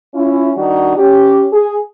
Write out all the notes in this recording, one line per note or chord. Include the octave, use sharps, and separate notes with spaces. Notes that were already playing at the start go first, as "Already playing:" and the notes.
C#4 E4 F4
D#3 G3 D4 D#4 F#4
C#4 G4
G#4